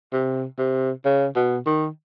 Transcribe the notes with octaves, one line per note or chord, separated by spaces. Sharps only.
C3
C3
C#3
B2
D#3